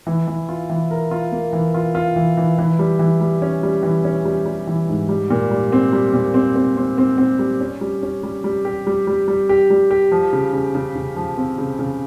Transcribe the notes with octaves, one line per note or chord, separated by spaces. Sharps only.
E3
E3
F4
E3
A#4
F4
A#3
E3
F4
F4
E3
E3
E3
G3
E3
G3
C#4
G3
E3
C#4
G3
G3
E3
G#2
G3
A#2
G3
C4
G3
A#2
C4
C4
C4
C4
C4
G3
C#4
G3
C#4
G3
G3
G4
G3
G3
G3
G4
G3
G4
F3
C#3
C#3
C#3
C#3
F3
C4
C#3
C#3